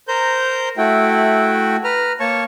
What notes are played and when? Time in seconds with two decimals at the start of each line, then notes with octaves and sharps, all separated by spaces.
0.08 A#4 C5 A#5 G6
0.77 A3 E4 F#4 G5
1.84 B4 A#5 F6
2.20 A#3 C#5 A5 C#6